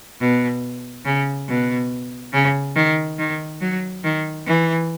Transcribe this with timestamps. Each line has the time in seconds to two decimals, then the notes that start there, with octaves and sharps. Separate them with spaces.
0.20 B2
1.05 C#3
1.48 B2
2.33 C#3
2.76 D#3
3.19 D#3
3.61 F#3
4.04 D#3
4.46 E3